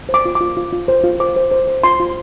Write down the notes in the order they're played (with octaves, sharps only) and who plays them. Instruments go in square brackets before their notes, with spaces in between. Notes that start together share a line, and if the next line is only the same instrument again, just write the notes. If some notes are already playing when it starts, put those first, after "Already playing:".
[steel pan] C5
D6
F4
D6
F4
F4
F4
C5
F4
C5 D6
C5
C5
C5
F4 C6
F4